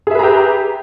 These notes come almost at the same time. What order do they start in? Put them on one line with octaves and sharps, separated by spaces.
G#4 E5 B4 A#5 G4